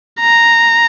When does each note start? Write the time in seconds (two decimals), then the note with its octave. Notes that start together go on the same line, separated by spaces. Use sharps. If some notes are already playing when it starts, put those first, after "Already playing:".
0.20 A#5